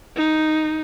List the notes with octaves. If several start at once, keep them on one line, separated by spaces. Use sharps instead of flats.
D#4